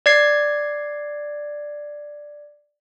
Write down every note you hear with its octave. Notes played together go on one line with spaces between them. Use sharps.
D5 G#6 C7